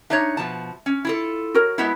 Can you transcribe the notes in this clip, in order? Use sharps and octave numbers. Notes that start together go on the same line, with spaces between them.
D4 D#4 C#5 E5
B2 F3 A5
C#4
E4 F4 A4
F#4 A#4 C#5
G#3 B3 E4